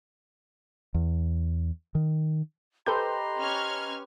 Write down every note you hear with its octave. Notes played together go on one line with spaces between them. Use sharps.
E2
D#3
G4 A4 B4 C5 D#5 A#5 C6 G6
C#4 F6 G#6